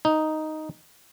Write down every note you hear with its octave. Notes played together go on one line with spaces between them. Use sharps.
D#4